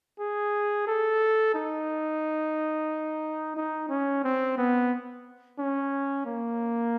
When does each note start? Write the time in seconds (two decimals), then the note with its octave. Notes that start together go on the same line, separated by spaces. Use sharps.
0.20 G#4
0.87 A4
1.54 D#4
3.57 D#4
3.89 C#4
4.24 C4
4.58 B3
5.59 C#4
6.26 A#3